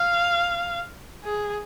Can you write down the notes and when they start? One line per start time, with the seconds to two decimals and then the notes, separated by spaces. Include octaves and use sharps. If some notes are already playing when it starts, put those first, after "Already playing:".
Already playing: F5
1.25 G#4